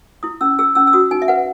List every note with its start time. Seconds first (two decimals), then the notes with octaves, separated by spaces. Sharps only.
0.23 E4 D#6
0.41 C#4 E6
0.59 G#4 E6
0.75 C#4 E6
0.87 E6
0.93 F#4 D#6
1.11 D#4 G#5
1.22 E5
1.28 B4 F#5